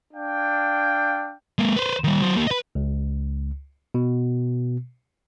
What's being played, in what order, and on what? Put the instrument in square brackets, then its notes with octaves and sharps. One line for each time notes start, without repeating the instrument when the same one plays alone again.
[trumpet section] D4 F5 G5
[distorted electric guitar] G#3 A#3
B4 C5
D#3 G3
F#3 C5
A#3 G4
B4 D#5
[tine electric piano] C#2
B2